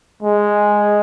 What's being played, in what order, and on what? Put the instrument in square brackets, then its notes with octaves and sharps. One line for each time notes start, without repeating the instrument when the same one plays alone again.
[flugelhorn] G#3